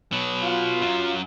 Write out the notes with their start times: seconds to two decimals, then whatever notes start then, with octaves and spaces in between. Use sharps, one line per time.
0.12 B2 F#3
0.43 F4
0.82 F#2 F#3